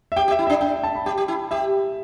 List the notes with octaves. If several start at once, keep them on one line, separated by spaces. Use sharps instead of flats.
E5
G4 G5
G4
E5
E4
D4 E5
D4 G5
G5
A5
B5
G4 G5
G4
E4
G4 E5